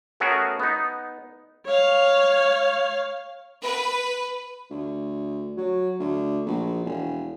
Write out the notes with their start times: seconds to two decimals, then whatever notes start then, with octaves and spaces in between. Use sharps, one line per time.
0.20 A3 B3 C#4 F#4 G#4 A#4
0.60 B3 D#4
1.66 C#5 F5
3.63 B4
4.70 D2
5.57 F#3
6.00 D2
6.46 A#1
6.84 E1